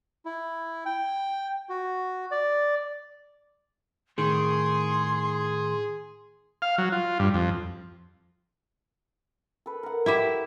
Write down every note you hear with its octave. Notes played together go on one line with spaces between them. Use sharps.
E4
G5
F#4
D5
A2 D#3 G#4 C6
F5
F#3
F4
G2
F2
A4 B4
A#4 F#5
E4 G4 E5